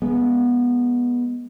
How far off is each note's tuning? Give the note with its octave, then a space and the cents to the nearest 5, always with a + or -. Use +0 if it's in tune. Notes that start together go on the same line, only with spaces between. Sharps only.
G#3 +0 B3 -15